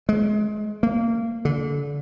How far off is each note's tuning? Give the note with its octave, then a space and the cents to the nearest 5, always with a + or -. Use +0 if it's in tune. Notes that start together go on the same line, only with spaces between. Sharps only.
G#3 +25
A#3 -25
D3 -30